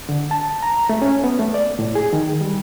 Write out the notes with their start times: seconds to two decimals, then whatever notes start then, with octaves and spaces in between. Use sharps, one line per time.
0.09 D3
0.31 A5
0.62 A#5
0.89 A3
1.02 C#4
1.24 B3
1.39 A3
1.54 D5
1.79 A2
1.95 G#4
2.13 D#3
2.41 G3